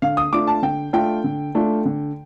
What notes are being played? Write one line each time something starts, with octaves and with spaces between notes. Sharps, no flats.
D3 F5
D#6
A3 D4 F4 D6
A5
D3 G5
A3 D4 F4 G5
D3
A3 D4 F4
D3